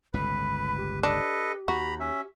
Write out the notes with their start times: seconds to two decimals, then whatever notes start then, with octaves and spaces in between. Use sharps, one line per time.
0.14 G1 C#2 A2 B4 B5
0.78 G4
1.03 D4 A4 B4 D#5
1.68 D#2 F#4 A#5 B5
2.00 C#4 E5